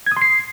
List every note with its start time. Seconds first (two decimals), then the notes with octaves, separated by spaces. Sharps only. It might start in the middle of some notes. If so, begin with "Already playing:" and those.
0.06 G#6
0.12 D#6
0.17 C6
0.22 C7